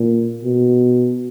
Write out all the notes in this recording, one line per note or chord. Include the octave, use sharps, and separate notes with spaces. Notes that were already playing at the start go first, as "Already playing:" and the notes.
Already playing: A#2
B2